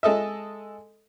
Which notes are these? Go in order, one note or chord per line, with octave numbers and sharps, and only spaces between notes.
G#3 A4 D#5 E5